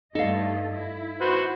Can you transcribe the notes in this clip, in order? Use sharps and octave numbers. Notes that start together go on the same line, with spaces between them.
G2 A3 D#4 A4 D#5 F5
E4
F#4 B4 C5